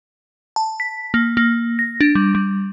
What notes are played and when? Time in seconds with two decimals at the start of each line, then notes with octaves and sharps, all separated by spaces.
0.56 A5
0.80 B6
1.14 A#3
1.37 A#3
1.79 A#6
2.01 D4
2.15 G3
2.35 G3